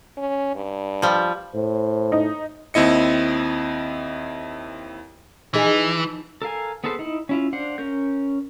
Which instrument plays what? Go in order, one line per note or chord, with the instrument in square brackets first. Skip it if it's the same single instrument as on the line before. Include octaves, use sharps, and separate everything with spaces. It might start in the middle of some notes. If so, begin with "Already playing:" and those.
[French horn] C#4
G2
[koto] F3 G3
[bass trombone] A2 [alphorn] C5
[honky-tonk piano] D#4
[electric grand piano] D#2 C4 E4 D#5 C#7
[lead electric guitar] E3 [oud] F3 D#4 G#4
[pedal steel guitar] A4 A#4 F5 G#5
B3 G#4 A4 B4 C5
D#4 E4
C#4 E4 F4
D4 C5 F5 F#5
C#4 A#4 G6